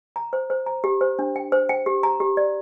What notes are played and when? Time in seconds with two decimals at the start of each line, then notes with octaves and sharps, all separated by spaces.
0.16 A#5
0.33 C5
0.50 C5
0.66 A#5
0.84 G4
1.01 C5
1.19 D4
1.36 G5
1.52 C5
1.69 G5
1.86 G4
2.03 A#5
2.20 G4
2.37 D5